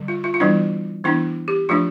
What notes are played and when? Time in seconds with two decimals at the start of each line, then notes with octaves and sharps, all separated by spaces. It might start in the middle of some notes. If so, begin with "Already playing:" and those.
Already playing: D3 G3
0.08 F4
0.24 F4
0.34 F4
0.40 E3 G3 B3 D4 E4
1.04 E3 B3 D4 E4
1.48 G4
1.69 F3 A3 D4 F4